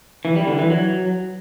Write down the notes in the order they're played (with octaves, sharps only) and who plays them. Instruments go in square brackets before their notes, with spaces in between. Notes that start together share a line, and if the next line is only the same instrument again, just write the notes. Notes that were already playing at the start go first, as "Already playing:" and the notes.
[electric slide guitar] E3
G3
D3
E3
F#3